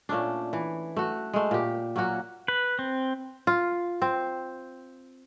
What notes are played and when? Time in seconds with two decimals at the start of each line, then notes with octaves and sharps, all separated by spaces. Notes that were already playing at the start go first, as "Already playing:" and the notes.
0.09 A#2 A3 C#4 D4
0.53 E3
0.97 A3 F#4
1.34 G#3 A3
1.51 A#2 G4
1.96 F#3 A#3 C#4 F#4
2.48 B4
2.79 C4
3.47 F4
4.02 C4